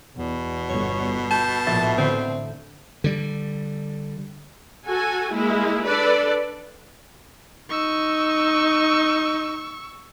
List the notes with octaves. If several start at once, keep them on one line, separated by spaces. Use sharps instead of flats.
E2 B2
G1 C#5
A5 G6
A#1 A2 E5 A6
D3 A3 C4 C5
D3 G3
F#4 A4 G#5
G#3 A#3 E4
D4 A4 B4 D5
D#4 C#6 E6